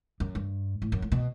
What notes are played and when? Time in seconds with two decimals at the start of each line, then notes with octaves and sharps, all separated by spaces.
0.20 F#2
0.35 G2
0.82 A2
0.92 F#2
1.02 A2
1.12 B2